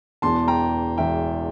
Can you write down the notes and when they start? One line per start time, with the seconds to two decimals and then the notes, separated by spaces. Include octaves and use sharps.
0.22 E1 E2 E3 A5 C6
0.48 G5 A#5
0.98 E1 E2 E3 E5 G5